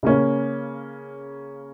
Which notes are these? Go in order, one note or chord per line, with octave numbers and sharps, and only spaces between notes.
C#3 A#3 C#4